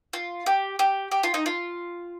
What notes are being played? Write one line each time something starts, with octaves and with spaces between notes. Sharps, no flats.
F4
G4
G4
G4
F4
D#4
F4